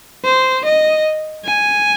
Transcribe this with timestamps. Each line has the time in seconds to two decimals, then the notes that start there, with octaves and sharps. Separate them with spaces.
0.25 C5
0.65 D#5
1.45 G#5